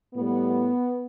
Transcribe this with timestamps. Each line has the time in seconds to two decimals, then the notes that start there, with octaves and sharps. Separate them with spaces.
0.15 A2 G3 B3